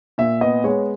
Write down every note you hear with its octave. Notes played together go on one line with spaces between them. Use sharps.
A#2 E5
B3 D#5
G#3 C#5